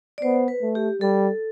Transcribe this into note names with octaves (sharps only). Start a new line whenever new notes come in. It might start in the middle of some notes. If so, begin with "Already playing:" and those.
D5
B3 C5
B4
A3
G4
G3 A4